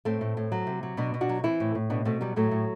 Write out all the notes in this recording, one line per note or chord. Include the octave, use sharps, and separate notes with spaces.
A2 A3 C4
A2
A2
F#3
C3
F#3
B2 B3 D4
B2
D4 F#4
F#3
E3 C4 E4
A2
A2
B2 B3 D4
B2 A3 C4
F#3 G3 B3
A2 F#3 A3
A2